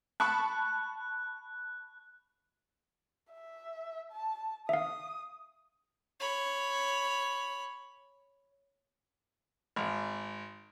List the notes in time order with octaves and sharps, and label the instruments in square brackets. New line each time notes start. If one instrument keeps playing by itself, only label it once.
[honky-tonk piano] A5 B5 C#6 [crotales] F#6
[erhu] E5
A5
[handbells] E5 F5 [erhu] D#6
[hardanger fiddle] C#5 B5
[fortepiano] G#1